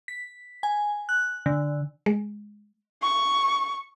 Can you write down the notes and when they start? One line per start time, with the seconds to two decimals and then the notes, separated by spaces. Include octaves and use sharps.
0.08 B6
0.63 G#5
1.09 F#6
1.46 D3
2.06 G#3
3.02 C#6